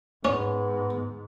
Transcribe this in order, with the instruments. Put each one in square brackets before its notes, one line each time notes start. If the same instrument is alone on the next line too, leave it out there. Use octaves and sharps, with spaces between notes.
[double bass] G#2 [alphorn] B3 [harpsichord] C#4